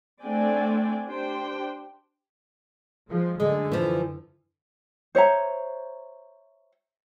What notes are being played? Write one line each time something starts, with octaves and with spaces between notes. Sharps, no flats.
A3 C4 D4 D5 G5 G#5
D4 G4 C5 G5
F3 G#3
F#2 D3 G#3
E3 F3
C5 C#5 E5 A#5